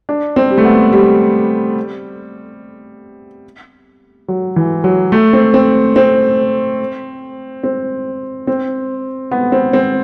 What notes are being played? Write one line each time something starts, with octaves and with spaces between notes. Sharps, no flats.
D4
C4
G3
A3
B3
G3
F#3
E3
F#3
A3
C4
C4
C4
C4
C4
B3
C4
C4